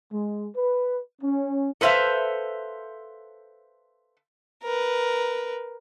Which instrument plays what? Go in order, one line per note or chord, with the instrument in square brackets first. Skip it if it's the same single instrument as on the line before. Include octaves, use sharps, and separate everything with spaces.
[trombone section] G#3
B4
C#4
[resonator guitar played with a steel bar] A4 B4 C5 E5 F5
[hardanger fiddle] A#4 B4